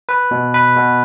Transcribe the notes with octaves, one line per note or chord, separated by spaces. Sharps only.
B4
B2
B4
B2